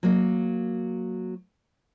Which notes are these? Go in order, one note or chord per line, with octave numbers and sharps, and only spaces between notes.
F#3 A#3